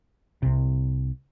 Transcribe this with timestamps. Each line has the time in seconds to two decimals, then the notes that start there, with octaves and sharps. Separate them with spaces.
0.42 C2 C3